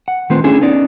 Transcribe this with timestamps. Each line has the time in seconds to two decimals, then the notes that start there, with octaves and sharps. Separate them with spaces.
0.08 F#5
0.30 D#3 A3 C4 F4 B4 C5
0.44 C#4 D4 E4 G#4 A4
0.61 B3 C#4 D#4 D5